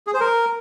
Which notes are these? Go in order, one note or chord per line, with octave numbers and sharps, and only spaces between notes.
G#4
C5
A#4